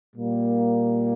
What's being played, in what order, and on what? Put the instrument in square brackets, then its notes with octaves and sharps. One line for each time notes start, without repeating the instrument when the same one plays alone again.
[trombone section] A#2 G3 A#3